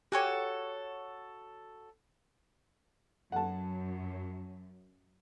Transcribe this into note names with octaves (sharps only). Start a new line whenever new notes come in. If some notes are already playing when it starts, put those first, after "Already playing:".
F#4 G4 A4 C#5 G#5
F#2 F#5 A5